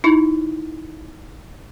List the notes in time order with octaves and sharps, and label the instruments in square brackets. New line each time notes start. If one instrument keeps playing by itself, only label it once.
[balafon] D#4 E4